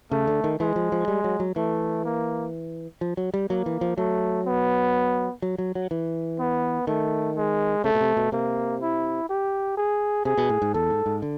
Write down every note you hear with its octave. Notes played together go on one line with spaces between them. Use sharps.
C#3 A3
D3
D#3
E3 G#3
F3
F3
G3
F#3
F#3
E3 A3
A#3
F3
F#3
G3
F#3 A#3
E3
F3
F#3 A3
B3
F#3
F#3
F#3
E3
B3
D#3 A3
G#3
C#3 A3
B2
C3
B2
C3 A#3
E4
G4
G#4
C3 G#4
B2
A2
G#2
E2 A4
G#2
G#2
D3